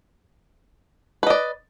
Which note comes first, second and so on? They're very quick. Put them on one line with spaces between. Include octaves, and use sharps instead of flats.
B4 D#5 D5